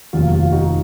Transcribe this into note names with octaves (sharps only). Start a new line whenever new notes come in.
F1 D#2 D#3 F#3 F4
F4
D#4 F#4